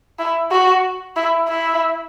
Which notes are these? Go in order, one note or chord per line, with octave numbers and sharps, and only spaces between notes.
E4
F#4
E4
E4